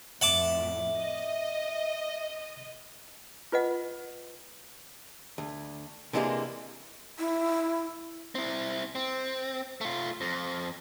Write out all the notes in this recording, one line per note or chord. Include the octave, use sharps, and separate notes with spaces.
F2 A2 E5 F#5 A5 D6
D#5
F4 B4 D#5 F#5
D2
C3 E3 G#3 A#3 D4 G4
E4
C4 E4
C4
A3 F4
F2